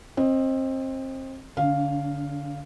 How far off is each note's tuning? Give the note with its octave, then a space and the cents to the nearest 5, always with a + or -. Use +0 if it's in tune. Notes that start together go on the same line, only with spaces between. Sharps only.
C4 +25 D#5 +0
D3 -15 C#4 +40 F5 +0